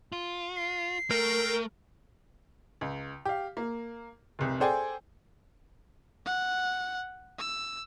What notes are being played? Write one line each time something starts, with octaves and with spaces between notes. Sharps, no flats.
F4
C7
A3 A#4 G5
C#2
G4 F5
A#3
F1 C2
G#4 A4 C5 D5 G5 G#5
F#5
E6